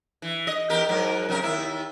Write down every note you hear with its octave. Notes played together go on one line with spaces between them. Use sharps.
E3
D#5
E2 G4 A#4
G#2 F#3 A#4
F#2 C3 A#4
D#2 E4